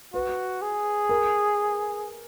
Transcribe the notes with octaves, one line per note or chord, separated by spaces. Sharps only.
F#4 B4
G#4
A#4